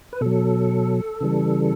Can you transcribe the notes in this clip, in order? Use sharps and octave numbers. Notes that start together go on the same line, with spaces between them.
B4
B2 F#3 A4
C#3 E3 G3